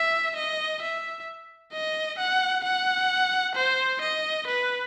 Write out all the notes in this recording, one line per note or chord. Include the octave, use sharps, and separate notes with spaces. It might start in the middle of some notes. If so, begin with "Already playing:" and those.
Already playing: E5
D#5
E5
D#5
F#5
F#5
C5
D#5
B4